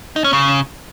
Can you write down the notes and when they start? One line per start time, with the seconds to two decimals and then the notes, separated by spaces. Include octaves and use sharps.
0.16 D#4
0.24 C#4
0.33 C#3